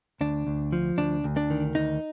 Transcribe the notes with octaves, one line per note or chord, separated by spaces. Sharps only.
D2 D4
D2
F3
D2 D4
D2
D4
D#3
D2 D#4